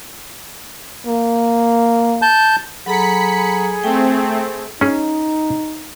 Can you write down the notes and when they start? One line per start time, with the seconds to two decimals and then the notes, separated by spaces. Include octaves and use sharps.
1.07 A#3
2.22 A5 G6
2.86 F#3 G#4 A4 A#5 B5 B6 C#7
3.84 A3 C4 G5
4.81 C#4 D#4 G#4